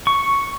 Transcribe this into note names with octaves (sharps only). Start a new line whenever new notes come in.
C#6